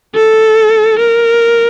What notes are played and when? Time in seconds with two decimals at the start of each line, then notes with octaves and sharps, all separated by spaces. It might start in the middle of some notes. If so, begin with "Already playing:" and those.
0.15 A4
0.99 A#4